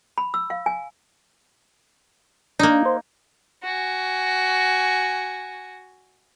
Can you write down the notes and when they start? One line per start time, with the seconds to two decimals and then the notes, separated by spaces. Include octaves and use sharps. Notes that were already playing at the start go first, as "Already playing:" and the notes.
0.18 B5
0.34 E6
0.50 F5
0.66 G#5
2.59 A#3 D4 D#4
2.85 C5
3.64 F#4 G#5